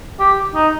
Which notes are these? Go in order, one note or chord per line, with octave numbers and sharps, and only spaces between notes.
G4
D#4